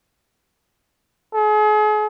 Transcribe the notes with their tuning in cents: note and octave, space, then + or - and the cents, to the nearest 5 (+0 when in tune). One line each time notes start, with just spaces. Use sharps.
G#4 +40